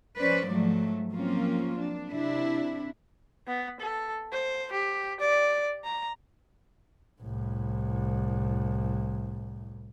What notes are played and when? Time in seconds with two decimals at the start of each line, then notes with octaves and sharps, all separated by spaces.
0.17 F2 C#4 B4 C5 D5
0.46 G#2 F3 F#3 A3
1.12 F3 F#3 A#3 C4 C#4 F4
1.77 D4
2.10 C3 D4 E4
3.47 B3
3.80 A4
4.33 C5
4.72 G4
5.20 D5
5.84 A#5
7.22 C2 A2